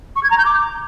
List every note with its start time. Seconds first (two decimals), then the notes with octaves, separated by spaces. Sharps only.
0.15 C#6
0.23 G#6
0.30 A#5
0.37 G6
0.45 D6